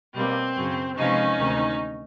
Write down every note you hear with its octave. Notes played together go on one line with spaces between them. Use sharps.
B2 G3 A#3 C4
F#2 C#3 F#3
C3 F3 G#3 B3 C#4 D#4
D2 C3 D#3